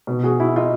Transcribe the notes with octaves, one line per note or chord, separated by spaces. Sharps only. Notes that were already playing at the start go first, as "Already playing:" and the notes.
B2
F#4 G#4
E4 F#4
D#4 F4